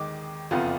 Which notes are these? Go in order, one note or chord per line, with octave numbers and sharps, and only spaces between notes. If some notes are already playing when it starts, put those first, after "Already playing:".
Already playing: D#2 D#3 G#3 D#4 D6
F#1 F2 F3 B3 F4